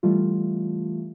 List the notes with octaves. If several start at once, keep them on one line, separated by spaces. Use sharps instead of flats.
E3 G3 A3 F4